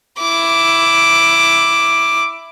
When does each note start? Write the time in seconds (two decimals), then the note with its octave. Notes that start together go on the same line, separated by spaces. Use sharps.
0.19 E4 D6